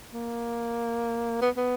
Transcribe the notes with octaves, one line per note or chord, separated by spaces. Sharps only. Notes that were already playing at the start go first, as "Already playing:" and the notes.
A#3
B3
B3